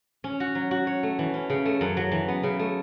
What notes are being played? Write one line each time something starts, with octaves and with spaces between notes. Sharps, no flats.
C#4
F#4
F#3
F#4
C#5
A3
E3
C#4
C#3
A3
F#2
F#3
E3
B3
C#3
A3